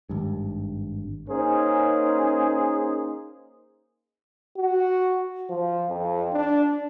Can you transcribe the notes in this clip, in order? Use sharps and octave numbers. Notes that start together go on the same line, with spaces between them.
G#1 G2
A#3 C#4 D#4 G#4 A#4 C5
F#4
F3
F2
D4